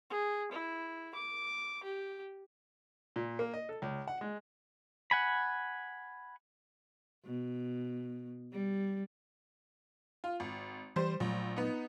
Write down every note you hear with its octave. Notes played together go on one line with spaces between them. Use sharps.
G#4
E4
D6
G4
A#2
A#3
D#5
A4
C#2
F#5
G#3
F#5 G#5 B5
B2
G3
F4
G#1
E3 G3 C5
A#1 A#2 F#3 A3
B3 D#4